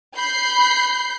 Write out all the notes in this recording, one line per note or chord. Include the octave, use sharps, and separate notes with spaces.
B5 G6 C7